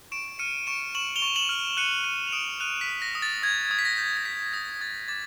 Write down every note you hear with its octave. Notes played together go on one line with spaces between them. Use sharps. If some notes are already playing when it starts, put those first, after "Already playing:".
C#6 D7 E7
F6 C#7 D#7
C#6 D7 E7
C#6 E7 F#7
F7 G7
C#6
E7 F#7
F6
F#6 C#7 D#7
F#6 C#7 D#7
F7
D#6 D7 E7
F#6 D#7 F7
B6
D#6
A#6
D#6
A6
D#6 G#6
D#6
B6
A#6
G6
A#6
G6 B6
D#6 A#6
D#6 A6
D6 A6